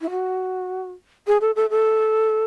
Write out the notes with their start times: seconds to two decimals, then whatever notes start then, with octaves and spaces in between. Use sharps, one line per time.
0.01 E4
0.11 F#4
1.27 G#4
1.41 A4
1.56 A4
1.70 A4